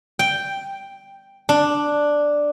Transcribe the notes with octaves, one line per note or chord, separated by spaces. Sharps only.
G5
D4